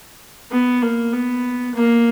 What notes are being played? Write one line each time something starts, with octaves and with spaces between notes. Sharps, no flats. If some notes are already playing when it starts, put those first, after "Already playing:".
B3
A#3
B3
A#3